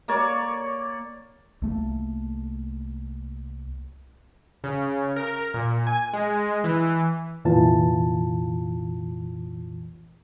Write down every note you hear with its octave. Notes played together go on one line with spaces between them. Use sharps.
A#3 C#5 D5
C2 A3 A#3
C#3
A#4
A#2
G#5
G#3
E3
C2 F2 A#2 E3 F4 A5